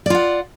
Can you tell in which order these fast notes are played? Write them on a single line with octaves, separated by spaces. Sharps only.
D5 F4 F#5